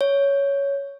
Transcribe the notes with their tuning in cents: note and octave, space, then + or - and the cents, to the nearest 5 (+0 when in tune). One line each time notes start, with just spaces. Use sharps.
C#5 +10